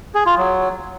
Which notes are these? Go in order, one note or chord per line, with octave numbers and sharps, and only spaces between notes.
G#4
F4
F#3